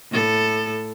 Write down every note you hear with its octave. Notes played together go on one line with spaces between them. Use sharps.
A2 A4